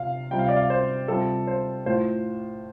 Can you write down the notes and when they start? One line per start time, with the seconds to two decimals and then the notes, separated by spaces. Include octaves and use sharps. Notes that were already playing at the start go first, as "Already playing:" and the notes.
Already playing: C3 F4 F5
0.31 C3 G3 C4 F4 G5
0.39 F5
0.49 D5
0.56 F5
0.70 C5
1.08 C3 G3 C4 F4 A4
1.47 C5
1.86 A2 A3 F4 C5